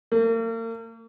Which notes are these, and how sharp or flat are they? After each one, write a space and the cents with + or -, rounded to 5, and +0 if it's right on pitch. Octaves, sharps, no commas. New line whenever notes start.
A#3 -40